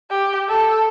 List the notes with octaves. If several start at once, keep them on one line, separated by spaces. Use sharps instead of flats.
G4
A4